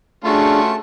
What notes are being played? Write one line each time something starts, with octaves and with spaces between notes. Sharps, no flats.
A3 C#4 D4 F4 F#4 G#4 A5